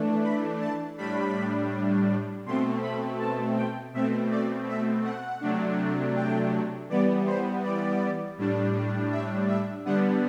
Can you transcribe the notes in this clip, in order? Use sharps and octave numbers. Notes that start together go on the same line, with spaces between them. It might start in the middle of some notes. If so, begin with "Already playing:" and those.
Already playing: E3 A3 D4
B5
A5
A2 G3 D4 B5
B2 A3 C4 C6
B5
A5
G5
B2 A3 C4 E5
D5
E5
F#5
C3 F#3 A3 D4
G5
E3 G3 B3 D5
C5
D5
A2 G3 D4
E5
E5
D3 G3 B3 D4 F#5